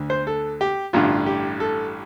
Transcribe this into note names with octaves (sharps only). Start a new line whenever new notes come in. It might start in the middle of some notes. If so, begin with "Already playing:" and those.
Already playing: D2 D3
C5
A4
G4
A1 G2 D3 F4
G4
A4